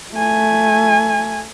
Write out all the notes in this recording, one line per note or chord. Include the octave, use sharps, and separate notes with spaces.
A3 G#5